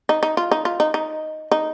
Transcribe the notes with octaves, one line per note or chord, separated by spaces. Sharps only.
D#4
D#4
F4
D#4
F4
D#4
D#4
D#4